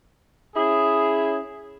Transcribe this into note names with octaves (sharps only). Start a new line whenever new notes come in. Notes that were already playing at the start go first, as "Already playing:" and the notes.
C#4 E4 G#4